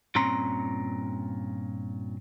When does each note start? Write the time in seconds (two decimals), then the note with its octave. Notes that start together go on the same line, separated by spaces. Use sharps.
0.15 G2 A#2 C4 C#4 A#5 C6